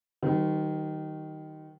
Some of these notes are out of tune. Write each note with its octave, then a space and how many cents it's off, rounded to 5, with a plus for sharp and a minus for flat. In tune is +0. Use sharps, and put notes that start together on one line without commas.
D#3 +0 G3 -45 C5 -40